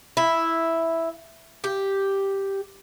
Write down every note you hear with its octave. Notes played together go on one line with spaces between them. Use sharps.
E4
G4